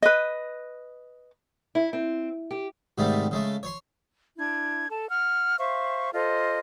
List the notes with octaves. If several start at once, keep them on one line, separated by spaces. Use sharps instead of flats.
B4 D#5
E4
C4
G4
G#2 C3 D#3 G3 A3
C#3 G#3 A3
C#5 C6
D4 E4 G#6
A4 A5
F#5 F6
C5 E5 F5 C#6
F4 A4 C5 D#5